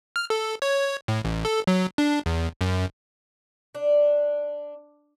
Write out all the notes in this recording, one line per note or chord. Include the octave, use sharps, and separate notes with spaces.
F6
A4
C#5
A2
A1
A4
F#3
D4
E2
F#2
D4